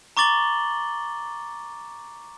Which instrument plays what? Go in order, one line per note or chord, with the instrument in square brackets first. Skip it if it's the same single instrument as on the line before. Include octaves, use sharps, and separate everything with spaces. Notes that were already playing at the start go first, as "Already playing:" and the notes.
[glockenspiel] A#5 C#6 D6 A6 F#7 G7